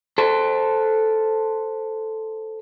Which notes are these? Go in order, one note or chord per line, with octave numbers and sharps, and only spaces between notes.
A4 C5